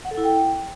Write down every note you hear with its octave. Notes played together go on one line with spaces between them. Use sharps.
F#5
A4
E4
G5